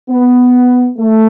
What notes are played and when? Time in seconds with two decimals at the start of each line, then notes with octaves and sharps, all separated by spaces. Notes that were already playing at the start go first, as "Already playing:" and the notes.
0.10 B3
0.98 A3